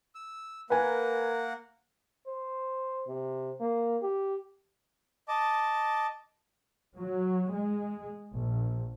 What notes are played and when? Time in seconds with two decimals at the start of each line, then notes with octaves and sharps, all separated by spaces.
0.15 E6
0.70 A#3 A#4 B4 F#5 G#5
2.27 C5
3.07 C3
3.60 A#3
4.02 G4
5.28 D#5 A5 D6
6.99 F#3
7.51 G#3
8.33 A#1